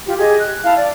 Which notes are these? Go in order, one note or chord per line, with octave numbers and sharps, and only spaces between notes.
F4 G4
G4 G#4 D#5
F#6
E4 F5 A5
D5